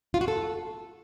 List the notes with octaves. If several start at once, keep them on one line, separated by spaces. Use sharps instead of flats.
F4
F#4
A4